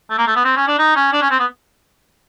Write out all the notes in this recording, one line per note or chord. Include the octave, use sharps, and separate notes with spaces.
A3
A#3
A3
B3
C4
C#4
D4
D#4
C#4
D4
C#4
C4
B3